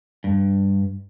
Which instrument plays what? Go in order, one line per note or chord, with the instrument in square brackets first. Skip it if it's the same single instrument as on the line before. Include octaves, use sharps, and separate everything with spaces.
[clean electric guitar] G2